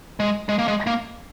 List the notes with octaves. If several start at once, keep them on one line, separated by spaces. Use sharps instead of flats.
G#3
G#3
A#3
G#3
A#3